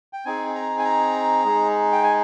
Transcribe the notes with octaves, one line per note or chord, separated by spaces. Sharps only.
G5
C4 D#4 G#4 G#5
A#5
G#5
A#5
G#3 D#4 G#4
G5
G#5